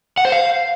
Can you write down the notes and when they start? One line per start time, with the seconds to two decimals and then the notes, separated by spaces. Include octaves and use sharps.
0.18 F#5
0.25 C5
0.32 F5